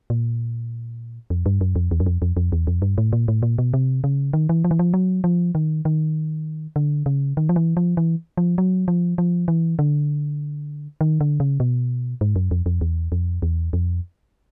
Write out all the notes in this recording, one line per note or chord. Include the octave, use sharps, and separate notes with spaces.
A#2
F2
G2
F#2
F2
E2
F#2
F2
F2
F2
E2
F2
G2
A2
A#2
A2
A#2
B2
C3
C#3
D#3
E3
F3
E3
F3
F#3
F3
D#3
D#3
D3
C#3
D#3
F3
E3
F3
E3
F3
F#3
F3
F3
E3
D3
D#3
D3
C#3
B2
G#2
F#2
F2
F2
E2
F2
E2
F2